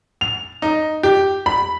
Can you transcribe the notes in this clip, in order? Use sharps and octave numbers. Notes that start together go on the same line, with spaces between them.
F7
D#4
G4
B5